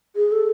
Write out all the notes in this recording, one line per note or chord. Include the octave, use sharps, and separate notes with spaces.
G#4
A4